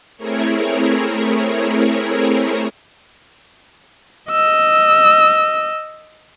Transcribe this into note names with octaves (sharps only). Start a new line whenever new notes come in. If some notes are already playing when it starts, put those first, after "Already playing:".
A3 C4 E4 G#4 A#4 C#5
D#5 E6